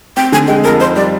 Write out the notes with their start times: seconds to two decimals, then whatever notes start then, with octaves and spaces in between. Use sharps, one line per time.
0.17 C4 G5
0.32 D3 G#5
0.48 G#3 G5
0.64 F2 A#4
0.80 D#4 C5
0.96 G3 D5